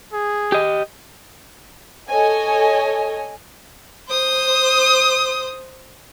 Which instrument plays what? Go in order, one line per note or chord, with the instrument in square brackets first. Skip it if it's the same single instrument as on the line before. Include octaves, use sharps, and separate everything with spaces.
[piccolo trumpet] G#4
[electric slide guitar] G4 D#5
[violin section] A4 C#5 D#5 G#5
[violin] C5 D#6